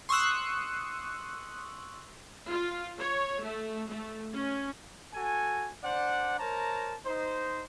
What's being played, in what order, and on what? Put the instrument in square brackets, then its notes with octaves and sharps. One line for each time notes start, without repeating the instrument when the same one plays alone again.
[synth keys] C6 C#6 D#6 E6 F#6
[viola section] F4
C#5
A3
A3
C#4
[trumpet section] F#4 A4 G#5
D4 C5 D5 F#5
A#4 C5 C#5 A5 A#5
D#4 C5